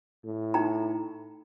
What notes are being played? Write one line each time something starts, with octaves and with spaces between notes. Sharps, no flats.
A2
D#4 G5 A#5